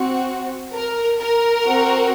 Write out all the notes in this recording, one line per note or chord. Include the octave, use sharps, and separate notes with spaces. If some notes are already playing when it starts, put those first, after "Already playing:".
Already playing: C4 F#4
A#4
A#4
C4 F#4